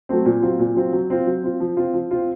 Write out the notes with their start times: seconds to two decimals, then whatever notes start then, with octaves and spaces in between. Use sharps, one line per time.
0.09 F#3 A3 C4
0.25 A#2
0.42 F#3 C4 F4
0.59 A#2
0.76 F#3 C4 F4
0.93 F#3
1.10 C4 F4
1.27 F#3
1.43 C4 F4
1.60 F3
1.77 C4 F4
1.93 F3
2.11 C4 F4